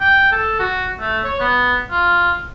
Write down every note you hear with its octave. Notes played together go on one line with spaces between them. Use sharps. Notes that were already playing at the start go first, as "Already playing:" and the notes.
G5
A4
F#4
A3
C#5
B3
F4